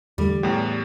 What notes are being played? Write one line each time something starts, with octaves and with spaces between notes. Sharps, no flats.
E2 D3 G3 A3
E2 A2 G4